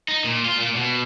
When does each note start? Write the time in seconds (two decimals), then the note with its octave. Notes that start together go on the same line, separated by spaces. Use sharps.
0.08 D#4
0.24 A#2
0.45 F4
0.57 A#2
0.75 B2